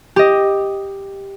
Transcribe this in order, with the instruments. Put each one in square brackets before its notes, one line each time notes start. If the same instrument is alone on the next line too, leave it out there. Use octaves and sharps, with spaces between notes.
[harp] G4 D#5